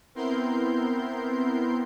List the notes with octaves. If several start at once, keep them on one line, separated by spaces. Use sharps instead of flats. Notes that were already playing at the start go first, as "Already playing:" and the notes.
B3 C4 E4 A#4 C6 G6